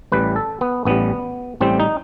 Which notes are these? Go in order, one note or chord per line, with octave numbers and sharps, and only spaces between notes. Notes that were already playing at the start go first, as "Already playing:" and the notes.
A1 A2 G3 B4
A4
B3
A1 A2 G3 B3
A1 A2 G3 C4
D#4